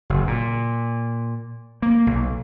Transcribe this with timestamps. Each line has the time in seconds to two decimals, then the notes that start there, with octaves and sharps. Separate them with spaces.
0.10 F#1
0.27 A#2
1.82 A#3
2.06 B1